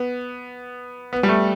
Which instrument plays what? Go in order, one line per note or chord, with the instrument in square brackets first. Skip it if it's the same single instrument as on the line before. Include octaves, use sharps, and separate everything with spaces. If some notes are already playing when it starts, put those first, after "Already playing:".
Already playing: [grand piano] B3
B3
G3
A3